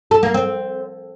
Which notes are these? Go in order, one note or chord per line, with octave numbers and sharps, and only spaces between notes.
A4
A#3
C4